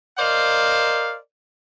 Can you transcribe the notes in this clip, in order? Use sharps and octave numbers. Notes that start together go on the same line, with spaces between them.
A#4 C5 D5 D#5 F5